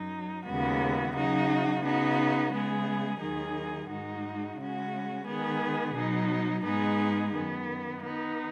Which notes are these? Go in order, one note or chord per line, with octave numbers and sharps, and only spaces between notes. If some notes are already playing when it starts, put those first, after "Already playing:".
Already playing: F#2 F#3 D#4
D#2 C#3 G#3 B3 F#4
C#3 F#3 D#4 F#4
C#3 B3 D#4 F#4
C#3 G#3 B3 G#4
D#2 D#3 F#3 D#4 G#4
G#2 G#3 D#4 F#4
C#3 G#3 C#4 F#4
D#3 G#3 B3 G#4
B2 F#3 D#4
G#2 G#3 B3 D#4 G#4
F#2 D#3 B3
D#3 B3 D#4